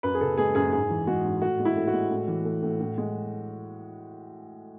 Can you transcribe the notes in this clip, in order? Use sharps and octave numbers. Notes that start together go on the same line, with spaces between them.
F#2 B4
G#4
C#3 A4
G#3 G#4
F#2 G#4
G#2 G#4
E3
G#3 F#4
G#2
A2 F#4
G#3
E4
A2
F#4
G#3
A2
E3
A3
A2
A2
G#3